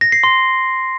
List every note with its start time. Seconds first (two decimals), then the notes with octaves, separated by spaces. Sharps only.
0.01 A#6
0.12 C7
0.24 C6